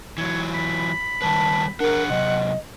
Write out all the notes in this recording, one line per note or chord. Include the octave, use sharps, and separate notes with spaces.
E3 F#3 C#5
B5
D#3 G3 B4 A5
D4 G#4 A#4 F#5
C3 F#3 D#5